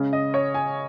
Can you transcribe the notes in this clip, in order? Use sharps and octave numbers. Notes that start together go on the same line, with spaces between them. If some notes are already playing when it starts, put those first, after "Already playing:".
Already playing: C#3 G#3 C#4
D#5
C#5
G#5